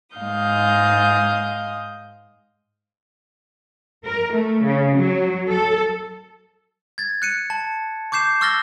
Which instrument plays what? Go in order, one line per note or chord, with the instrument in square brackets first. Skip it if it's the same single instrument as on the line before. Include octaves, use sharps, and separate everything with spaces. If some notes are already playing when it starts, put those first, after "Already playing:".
[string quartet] G#2 G#3 F5 D#6 G6
[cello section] A#4
A3
C#3
F#3
A4
[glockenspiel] G#6 A6
F#6 C#7 D#7
A5
C#6 D6 G6 C7 E7
C#6 E6 F6 A6 A#6 G7